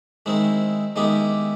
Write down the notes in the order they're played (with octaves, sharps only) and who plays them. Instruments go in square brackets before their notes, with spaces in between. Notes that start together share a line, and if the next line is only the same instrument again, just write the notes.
[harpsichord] D#3 G#3 C4 E4
D#3 G#3 B3 E4 G4